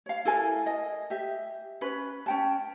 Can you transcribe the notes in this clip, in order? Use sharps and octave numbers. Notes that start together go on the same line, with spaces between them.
C#5 F5
E4 A4 A#4 G#5
D#5
G4 E5
C#4 B4
C#4 G5 A5